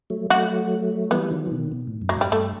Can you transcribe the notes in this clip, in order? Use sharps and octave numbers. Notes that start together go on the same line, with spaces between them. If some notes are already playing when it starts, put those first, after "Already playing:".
F#3 A3
F#3 A3 F#4
E3 G3 B3
D#3 F#3
E3
B2 D#3
B2
A2
F#2
A2 F#3
G2 G3
G2 A3